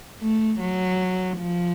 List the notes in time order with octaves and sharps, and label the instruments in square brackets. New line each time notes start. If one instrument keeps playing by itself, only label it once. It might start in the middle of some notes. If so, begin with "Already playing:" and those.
[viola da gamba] A3
F#3
F3